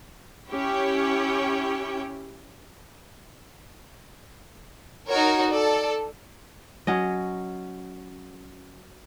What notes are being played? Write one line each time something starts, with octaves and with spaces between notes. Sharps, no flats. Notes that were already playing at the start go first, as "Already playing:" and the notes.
C#4 E4 G4 C#5 G5
D#4 F#4 A#4 C#5
A4 D5
F#3 C#4 D#5